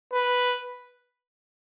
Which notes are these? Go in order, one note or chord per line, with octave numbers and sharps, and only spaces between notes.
B4